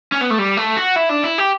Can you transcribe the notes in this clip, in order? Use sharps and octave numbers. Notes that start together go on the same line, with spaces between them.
C#4
B3
A3
G3
A3
F#4
E4
D4
E4
G4